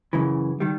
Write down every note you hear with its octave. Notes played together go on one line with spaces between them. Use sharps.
F#2 C#3 E3
D#3 G3